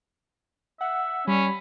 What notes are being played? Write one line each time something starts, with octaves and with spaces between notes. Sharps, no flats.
E5 F#5
G3 C#4 B5